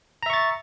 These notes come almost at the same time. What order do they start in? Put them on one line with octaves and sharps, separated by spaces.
A#5 E5 C#6 A6